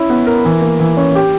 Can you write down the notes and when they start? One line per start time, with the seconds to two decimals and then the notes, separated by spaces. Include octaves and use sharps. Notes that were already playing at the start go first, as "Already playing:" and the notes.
Already playing: C#4 E4
0.10 B3
0.27 A#4
0.45 E3
0.62 A#3
0.80 E3
0.97 C#4
1.15 G4